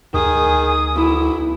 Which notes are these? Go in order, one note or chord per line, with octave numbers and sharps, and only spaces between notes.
D2 D#3 G#4 D#6
B1 E4